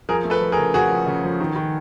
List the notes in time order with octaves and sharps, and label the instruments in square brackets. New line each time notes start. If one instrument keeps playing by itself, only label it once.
[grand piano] F3 [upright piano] G#4 A#4
[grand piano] A3
[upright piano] A4 B4
[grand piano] F3
[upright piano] G#4 A#4
[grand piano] C#3
[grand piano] C#3 [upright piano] F#4 G#4
[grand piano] F3
C#3
F3
D#3
D#3